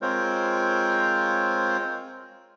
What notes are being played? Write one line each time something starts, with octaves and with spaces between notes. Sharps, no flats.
G#3 C4 F4 A#4 C5 C#5